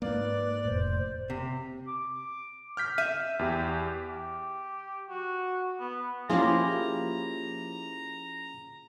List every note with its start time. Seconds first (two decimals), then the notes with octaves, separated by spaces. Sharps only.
0.02 G#2 A#3 B4 D5
0.65 F1 A2 C5
1.30 C3
1.87 D6
2.77 F6 G6 B6
2.98 E5 D#7
3.39 E2 G4
4.09 G4
5.10 F#4
5.80 B3
6.30 F3 A#3 C#4 E4 F4 G4 G#4 A#5